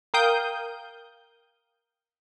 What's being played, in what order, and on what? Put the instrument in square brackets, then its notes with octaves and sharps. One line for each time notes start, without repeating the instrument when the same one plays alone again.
[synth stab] A#4 F5 G5 D#6 G6